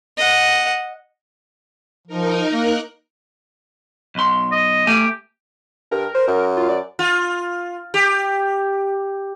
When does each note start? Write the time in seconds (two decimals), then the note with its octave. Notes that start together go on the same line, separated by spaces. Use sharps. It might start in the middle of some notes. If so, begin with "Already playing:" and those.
0.18 D#5 F#5
2.07 F3 D#4 A#4
2.52 A#3 A#4 F#6
4.15 B1 C6
4.52 D#5
4.87 A3 G4 G#5
5.91 G2 A#4
6.15 C5
6.28 F#2
6.57 F4
6.69 D5
6.99 F4
7.94 G4